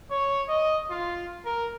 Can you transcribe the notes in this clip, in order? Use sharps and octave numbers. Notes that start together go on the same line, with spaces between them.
C#5
D#5
F4
A#4